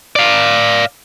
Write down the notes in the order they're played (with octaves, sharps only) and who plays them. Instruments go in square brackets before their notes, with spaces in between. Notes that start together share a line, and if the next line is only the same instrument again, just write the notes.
[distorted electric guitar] D5 F5